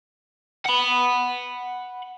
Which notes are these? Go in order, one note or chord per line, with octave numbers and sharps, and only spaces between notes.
F#5 B5